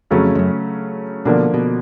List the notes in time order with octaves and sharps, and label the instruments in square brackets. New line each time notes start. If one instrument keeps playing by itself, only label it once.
[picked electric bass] F2 [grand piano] C#3 F#3 A3 C#4
[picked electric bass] F2
F#2
[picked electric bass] B2 [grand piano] D3 F3 A#3 D4
[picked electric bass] B2